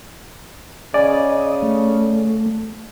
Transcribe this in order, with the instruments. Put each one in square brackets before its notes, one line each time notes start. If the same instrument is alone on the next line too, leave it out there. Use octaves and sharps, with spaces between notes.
[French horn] C#3 [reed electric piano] D5 G#5 [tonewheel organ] D#5
[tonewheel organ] A3